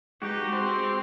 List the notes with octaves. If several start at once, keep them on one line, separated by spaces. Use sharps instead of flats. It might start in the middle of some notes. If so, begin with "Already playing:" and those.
G#3 D#4 F#4 G4 B4
G#3 C4 C5 G5 C6